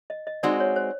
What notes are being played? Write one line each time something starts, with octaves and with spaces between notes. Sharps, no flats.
D#5
D#5
G#3 C4 D#4 F#4 D5
C#5
C5